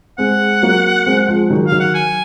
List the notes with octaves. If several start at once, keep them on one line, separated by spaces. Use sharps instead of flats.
G#3 C4 F#5
F#3 A#3
G#3 C4
F3 G#3
D#3 F#3
F5
D#3 F#3
F#5
G#5